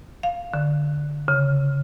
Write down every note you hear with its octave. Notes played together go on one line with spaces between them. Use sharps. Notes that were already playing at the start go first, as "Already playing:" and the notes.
F5
D3
C#3